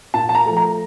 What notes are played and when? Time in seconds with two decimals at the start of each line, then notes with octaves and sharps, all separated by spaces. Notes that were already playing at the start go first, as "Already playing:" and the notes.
0.14 A#2 A5
0.29 A5
0.35 A#5
0.46 F3 A3
0.57 A#5